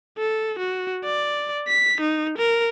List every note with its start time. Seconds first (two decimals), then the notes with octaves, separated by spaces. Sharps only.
0.19 A4
0.59 F#4
1.04 D5
1.68 B6
2.01 D#4
2.38 A#4